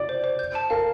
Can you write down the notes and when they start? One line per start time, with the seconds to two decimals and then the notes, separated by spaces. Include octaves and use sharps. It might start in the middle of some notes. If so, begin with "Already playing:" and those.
Already playing: D5
0.09 C5
0.24 C5
0.39 G6
0.55 A5
0.70 A#4 F5